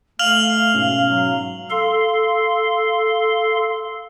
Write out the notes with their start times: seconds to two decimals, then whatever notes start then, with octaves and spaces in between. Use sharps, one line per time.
0.19 A3 F5 F6 F7 F#7
0.74 G#2 B2 C#4
1.06 F#3
1.70 A4 F5 C6